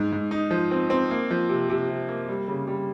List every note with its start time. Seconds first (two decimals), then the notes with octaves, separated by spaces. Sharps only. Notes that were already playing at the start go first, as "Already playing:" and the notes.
Already playing: G#2
0.12 G#2
0.31 D#4
0.51 F3
0.71 C4
0.90 C4
1.11 A#3
1.30 F3
1.49 C3
1.70 C3
1.89 C3
2.09 A#3
2.28 G3
2.48 C#3
2.67 G3